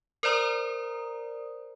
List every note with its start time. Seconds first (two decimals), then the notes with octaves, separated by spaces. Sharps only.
0.23 A#4 C5 D5 A#5 D#6